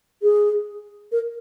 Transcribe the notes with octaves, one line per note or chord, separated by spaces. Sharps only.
G#4
A#4